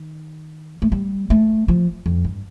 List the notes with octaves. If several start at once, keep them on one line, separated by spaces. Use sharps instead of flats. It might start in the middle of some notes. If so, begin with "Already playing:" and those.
Already playing: D#3
A3
G3
A3
F3
F2
G2